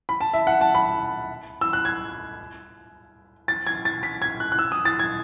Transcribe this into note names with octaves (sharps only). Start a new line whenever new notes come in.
B5
A5
E5
F#5
A5
B5
E6
F#6
G#6
A6
G#6
A6
B6
G#6
F#6
F#6
E6
D#6
A6
G#6